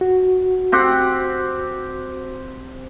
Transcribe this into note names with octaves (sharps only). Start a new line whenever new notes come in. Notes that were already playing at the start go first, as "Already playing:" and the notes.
F#4
C4 G4 F#5